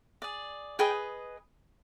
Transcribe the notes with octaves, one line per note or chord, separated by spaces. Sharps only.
G#4 D5
G#4 B4 D#5 G5